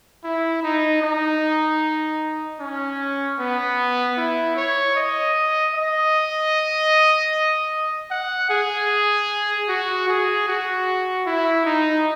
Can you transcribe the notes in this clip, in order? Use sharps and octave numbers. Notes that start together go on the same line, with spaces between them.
E4
D#4
D#4
C#4
B3
E4
C#5
D#5
D#5
F#5
G#4
F#4
G#4
F#4
E4
D#4